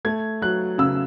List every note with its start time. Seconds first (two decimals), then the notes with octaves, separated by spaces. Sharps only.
0.05 A3 G#6
0.42 F#3 F#6
0.78 C#3 E6